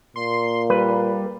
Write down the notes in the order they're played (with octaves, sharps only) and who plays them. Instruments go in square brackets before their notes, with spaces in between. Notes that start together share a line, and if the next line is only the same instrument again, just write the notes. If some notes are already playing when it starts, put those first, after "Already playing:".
[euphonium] A#2 [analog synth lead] C6
[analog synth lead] G3 [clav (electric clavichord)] B4